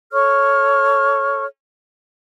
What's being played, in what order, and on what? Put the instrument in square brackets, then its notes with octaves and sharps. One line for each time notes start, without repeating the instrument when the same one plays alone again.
[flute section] A4 C#5 C#6 F6